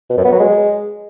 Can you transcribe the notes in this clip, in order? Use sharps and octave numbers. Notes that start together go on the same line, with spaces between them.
B2
F#2
B3
F#3
G#3